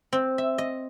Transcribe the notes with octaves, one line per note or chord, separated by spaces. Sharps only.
C4
E5
D#5